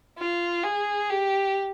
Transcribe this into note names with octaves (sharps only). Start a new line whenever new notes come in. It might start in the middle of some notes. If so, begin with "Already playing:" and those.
F4
G#4
G4